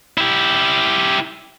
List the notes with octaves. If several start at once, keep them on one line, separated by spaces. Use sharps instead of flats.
E4 G4